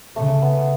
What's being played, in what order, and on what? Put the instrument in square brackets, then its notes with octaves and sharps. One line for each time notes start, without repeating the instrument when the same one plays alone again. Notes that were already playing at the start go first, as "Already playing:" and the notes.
[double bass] C#3 [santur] A3
[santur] B3